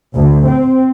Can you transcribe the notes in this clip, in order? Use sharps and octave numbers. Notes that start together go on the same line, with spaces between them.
D2
C4